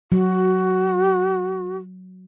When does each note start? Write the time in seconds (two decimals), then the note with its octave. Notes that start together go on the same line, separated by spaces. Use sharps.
0.12 F#3 F#4